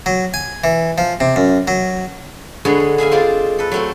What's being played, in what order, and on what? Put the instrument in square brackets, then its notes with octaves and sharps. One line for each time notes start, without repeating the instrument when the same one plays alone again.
[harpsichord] F#3
G#5
E3
F3
C3
F#2
F#3
[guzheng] D3 G#3 B3 G#4 C#5
B3
G#4 E5 F5 G#5
G#3 C4 F4 G#4 D5
A4 B4
F#3 A3 C4